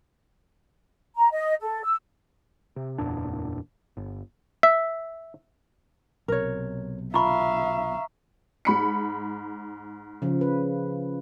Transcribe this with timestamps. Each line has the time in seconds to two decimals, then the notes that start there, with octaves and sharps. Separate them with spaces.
1.17 A#5
1.32 D#5
1.61 A4
1.83 E6
2.76 C3
2.98 F#1 E2 A#2 D4
3.97 G1
4.63 E5
6.28 B1 C3 A#4 C#5
7.14 F4 E5 F5 A#5 B5 C#6
8.65 G#2 B5 C#7
10.22 C#3 F3
10.41 B4